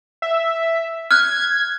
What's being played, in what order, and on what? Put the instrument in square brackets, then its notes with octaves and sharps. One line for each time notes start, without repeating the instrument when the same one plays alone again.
[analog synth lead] E5
[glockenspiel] F6 F#6 [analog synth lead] G#6